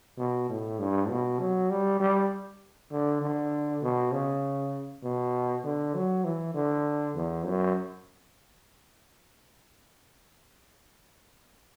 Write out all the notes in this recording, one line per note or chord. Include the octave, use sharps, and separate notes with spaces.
B2
A2
G2
B2
F#3
G3
G3
D3
D3
B2
C#3
B2
D3
F#3
E3
D3
E2
F#2